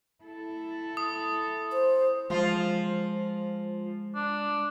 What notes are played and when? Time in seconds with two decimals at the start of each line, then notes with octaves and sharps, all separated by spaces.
0.24 E4 A4
0.97 D#6
1.72 C5
2.30 F3 G#3 F4
4.15 D4